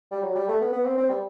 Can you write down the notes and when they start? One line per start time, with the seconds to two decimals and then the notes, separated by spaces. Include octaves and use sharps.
0.11 G3
0.23 F#3
0.35 G3
0.48 A3
0.61 B3
0.73 B3
0.85 C4
0.98 C4
1.10 G3